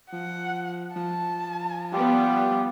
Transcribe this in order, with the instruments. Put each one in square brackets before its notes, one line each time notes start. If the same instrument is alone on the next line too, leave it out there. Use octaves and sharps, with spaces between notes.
[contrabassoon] F3 [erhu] F#5
[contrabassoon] F3 [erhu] A5
[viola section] G3 B3 [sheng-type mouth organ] F4 G4